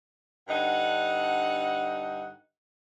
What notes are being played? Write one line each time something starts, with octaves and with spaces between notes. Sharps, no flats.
G2 D3 D#4 F#5